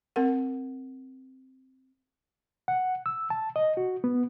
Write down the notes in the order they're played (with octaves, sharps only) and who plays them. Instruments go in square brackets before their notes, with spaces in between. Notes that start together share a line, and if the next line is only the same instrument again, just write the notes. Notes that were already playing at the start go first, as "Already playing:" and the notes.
[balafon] C4 A#4 F#5
[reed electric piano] F#5
E6
A5
D#5
F#4
B3